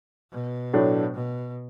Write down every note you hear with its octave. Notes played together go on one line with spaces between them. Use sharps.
B2
A2 F#3 A3 D4
B2